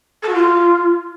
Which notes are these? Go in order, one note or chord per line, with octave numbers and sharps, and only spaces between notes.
A4
F#4
F4